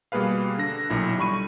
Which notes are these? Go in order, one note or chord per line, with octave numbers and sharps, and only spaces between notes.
B2 G3 A#3 G#4 B4 F5
D3 D4 A#6
B1 A#2 E4
D3 G3 B5 C#6 D#7